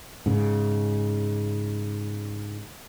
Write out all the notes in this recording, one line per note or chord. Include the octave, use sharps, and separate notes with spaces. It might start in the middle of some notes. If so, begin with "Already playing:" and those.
G#2 C#3